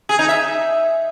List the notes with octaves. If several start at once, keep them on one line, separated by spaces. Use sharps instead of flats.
G#4
D#4
E5